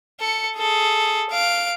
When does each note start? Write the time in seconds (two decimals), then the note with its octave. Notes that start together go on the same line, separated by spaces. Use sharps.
0.20 A4 C#7
0.58 G#4 A4
1.31 F5 D7